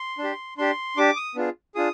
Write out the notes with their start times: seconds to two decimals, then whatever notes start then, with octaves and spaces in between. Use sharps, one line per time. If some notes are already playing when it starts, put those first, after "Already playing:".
Already playing: C6
0.18 D4
0.24 G4
0.58 D4 G4 C6
0.97 D4 G4 D6
1.16 D#6
1.35 B3 D4 F4 G#4
1.75 D4 F4 G#4 D#6